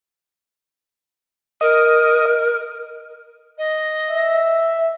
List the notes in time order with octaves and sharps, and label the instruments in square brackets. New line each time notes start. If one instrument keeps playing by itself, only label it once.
[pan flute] A#4 [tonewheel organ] D#5
[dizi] D#5
[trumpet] E5